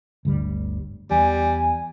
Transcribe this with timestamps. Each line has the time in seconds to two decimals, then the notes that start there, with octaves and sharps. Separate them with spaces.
0.25 G1 D2 G3
1.11 E2 G3 G#5